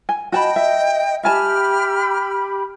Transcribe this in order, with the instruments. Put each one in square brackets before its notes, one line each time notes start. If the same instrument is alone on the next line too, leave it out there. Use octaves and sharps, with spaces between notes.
[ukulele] G#5
[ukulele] F#4 A5 B5 [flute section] D#5 [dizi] G5
[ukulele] E5
[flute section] G4 B5 [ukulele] E5 G#5 A5 [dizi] F6